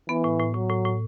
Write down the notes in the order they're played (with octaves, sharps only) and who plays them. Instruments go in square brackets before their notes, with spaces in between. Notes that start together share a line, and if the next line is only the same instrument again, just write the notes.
[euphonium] E3 [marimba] B3
[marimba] A2
A2
[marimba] A2 [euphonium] F#3
[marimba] A2
A2